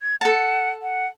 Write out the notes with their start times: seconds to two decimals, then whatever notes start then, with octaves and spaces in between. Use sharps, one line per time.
0.01 G#6
0.21 A4 F#5 A5
0.82 F#5